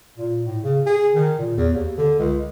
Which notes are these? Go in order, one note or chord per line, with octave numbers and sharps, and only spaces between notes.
A#2
A2
C#3
G#4
D#3
A#2
E2
D#2
D3
C#2